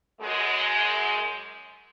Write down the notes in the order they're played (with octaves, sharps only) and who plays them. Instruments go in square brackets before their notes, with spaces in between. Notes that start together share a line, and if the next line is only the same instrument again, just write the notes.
[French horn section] F#2 G#3